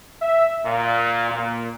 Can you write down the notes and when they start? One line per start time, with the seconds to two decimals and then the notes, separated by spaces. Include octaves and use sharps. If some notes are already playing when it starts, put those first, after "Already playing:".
0.22 E5
0.65 A#2
1.30 A#2